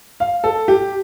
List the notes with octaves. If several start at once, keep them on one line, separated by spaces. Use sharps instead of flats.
F5
A4
G4